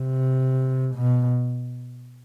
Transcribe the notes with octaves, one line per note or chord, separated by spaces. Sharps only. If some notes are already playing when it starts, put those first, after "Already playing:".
Already playing: C3
B2